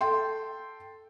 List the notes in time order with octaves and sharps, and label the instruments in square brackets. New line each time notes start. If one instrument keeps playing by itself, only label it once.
[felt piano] A4 G5 C6